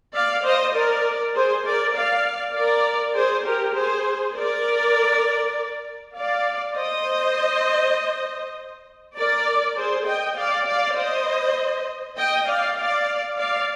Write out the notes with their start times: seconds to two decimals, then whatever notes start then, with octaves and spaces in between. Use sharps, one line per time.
0.14 D5 F5
0.44 C5 D#5
0.75 A#4 D5
1.35 G#4 C5
1.65 A#4 D5
1.95 D5 F5
2.55 A#4 D5
3.15 G#4 C5
3.45 G4 A#4
3.75 G#4 C5
4.36 A#4 D5
6.16 D5 F5
6.76 C5 D#5
9.17 A#4 D5
9.77 G#4 C5
10.07 D#5 G5
10.37 D5 F5
10.67 D5 F5
10.97 C5 D#5
12.17 D#5 G5
12.48 D5 F5
12.78 D5 F5
13.38 D5 F5